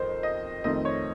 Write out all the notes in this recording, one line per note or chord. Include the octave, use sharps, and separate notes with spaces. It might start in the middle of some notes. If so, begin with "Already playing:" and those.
Already playing: F2 D#3 C5
D#5
F2 D#3 A3 C4 D#4 D#5
C#5